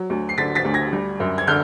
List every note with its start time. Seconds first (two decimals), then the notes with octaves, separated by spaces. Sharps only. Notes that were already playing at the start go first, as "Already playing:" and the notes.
Already playing: F#3
0.10 D2
0.29 C7
0.38 D3 A6 B6
0.55 A6 B6
0.65 D2
0.74 G#6 A#6
0.93 G3
1.20 F#2
1.38 G#6
1.47 D3 F6 G6